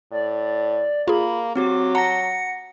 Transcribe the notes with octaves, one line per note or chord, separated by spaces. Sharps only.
A2 D5
A#3 F4 G#4 B5
F#3 C4 F#4 G4 D6
F#5 A5 A#5 A#6 C#7